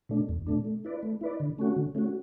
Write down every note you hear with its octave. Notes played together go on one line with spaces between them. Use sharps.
B2 A3 D4
E2
B2 A3 D4
A3
E4 B4 D5
A3
E4 B4 D5
D3
A3 C#4 F#4
D3
A3 C#4 F#4